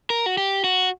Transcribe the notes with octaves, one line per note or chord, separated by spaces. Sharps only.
A#4
F#4
G4
F#4